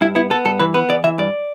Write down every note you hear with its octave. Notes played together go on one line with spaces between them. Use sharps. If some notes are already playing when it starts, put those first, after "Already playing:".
G2 E4
B3 E4
B3 A4
G2 A4
E3 B4
B3 B4
E2 D5
E3 E5
G2 D5